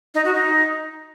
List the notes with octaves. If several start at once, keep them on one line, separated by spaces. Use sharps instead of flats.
D#4
F#4
D#4